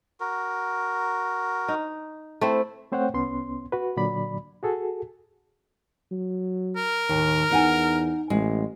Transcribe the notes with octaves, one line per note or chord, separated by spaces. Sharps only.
F#4 A#4
D#4
A3 C4 E4
A3 C4 C5 C#5 F#5 G5
C2 B3 C#4 C6
F#4 B4
A#2 D3 F#3 D5 B5
F#4 G#4 A4
F#3
A#4
D#2 A2 D#3
E2 D#4 F#5 G#5
A1 G#3